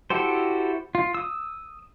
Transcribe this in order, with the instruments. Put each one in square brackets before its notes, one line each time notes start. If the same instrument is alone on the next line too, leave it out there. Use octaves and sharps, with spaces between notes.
[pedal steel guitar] E4 F#4 G4 A4 C5
F4
D#6 E6